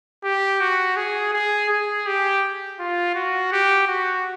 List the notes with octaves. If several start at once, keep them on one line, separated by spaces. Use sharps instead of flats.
G4
F#4
G#4
G#4
G#4
G4
F4
F#4
G4
F#4